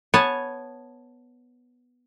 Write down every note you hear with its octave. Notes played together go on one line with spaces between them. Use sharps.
B3 C#5 G#5 A5